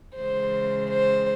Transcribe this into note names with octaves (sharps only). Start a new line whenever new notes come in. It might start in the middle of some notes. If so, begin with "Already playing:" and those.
C#3 E3 G#3 C5
C5